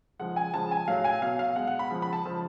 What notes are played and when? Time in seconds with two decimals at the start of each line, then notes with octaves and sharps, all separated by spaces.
0.19 C#3 F3 G#3 F#5
0.36 G#5
0.54 C#3 F3 G#3 A5
0.71 G#5
0.88 A2 F#3 F5
1.04 G#5
1.22 B2 F#3 F5
1.39 F5
1.56 B2 G#3 F#5
1.67 F#5
1.79 B5
1.90 C#3 F3 G#3
2.02 B5
2.13 A5
2.25 C#3 F3 G#3